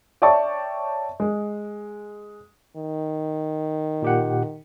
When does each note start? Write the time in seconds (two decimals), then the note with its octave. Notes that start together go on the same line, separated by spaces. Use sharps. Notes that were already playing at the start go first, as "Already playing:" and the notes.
0.22 C#5 D5 E5 G5 A5 C#6
1.20 G#3
2.76 D#3
4.02 A#2 G4 F#5